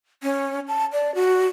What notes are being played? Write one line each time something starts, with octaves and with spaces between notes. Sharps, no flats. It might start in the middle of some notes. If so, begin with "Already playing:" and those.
C#4
A5
D5
F#4